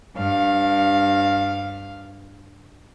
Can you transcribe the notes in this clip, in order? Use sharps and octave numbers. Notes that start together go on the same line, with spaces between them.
G2 F5